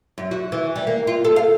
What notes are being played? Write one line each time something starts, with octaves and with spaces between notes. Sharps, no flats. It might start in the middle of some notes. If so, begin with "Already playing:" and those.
F#2
F#4
E3
G3
A#3
F4
A4
F5